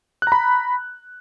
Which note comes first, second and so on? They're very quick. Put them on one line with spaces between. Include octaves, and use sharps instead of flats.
F#6 A#5 B5